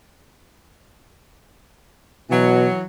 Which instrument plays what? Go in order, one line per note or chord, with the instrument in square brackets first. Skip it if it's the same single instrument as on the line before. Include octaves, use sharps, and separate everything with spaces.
[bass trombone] B2 [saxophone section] E3 F#3